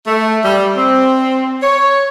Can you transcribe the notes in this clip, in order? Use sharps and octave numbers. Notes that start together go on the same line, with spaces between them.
A3
G3
C4
C#5